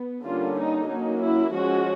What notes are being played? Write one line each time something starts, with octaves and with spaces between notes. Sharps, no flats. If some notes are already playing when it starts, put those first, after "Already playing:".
Already playing: B3
D3 G3 A#3 C#4 F4
D#4
F#3 A#3 C#4 D#4
E4
F3 G#3 C#4 F#4